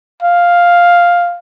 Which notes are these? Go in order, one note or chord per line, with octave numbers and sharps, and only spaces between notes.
F5